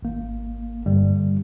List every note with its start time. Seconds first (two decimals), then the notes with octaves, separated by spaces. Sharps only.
0.02 G#1 A#3
0.86 G2 D3 G3